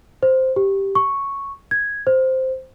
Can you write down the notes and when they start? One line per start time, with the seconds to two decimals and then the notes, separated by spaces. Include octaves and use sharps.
0.23 C5
0.56 G4
0.95 C#6
1.71 G#6
2.07 C5